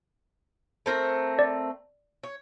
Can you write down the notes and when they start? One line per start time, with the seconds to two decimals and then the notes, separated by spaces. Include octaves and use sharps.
0.86 A3 C4 A#4
1.39 D5
2.23 C#5